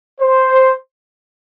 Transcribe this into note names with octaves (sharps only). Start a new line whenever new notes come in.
C5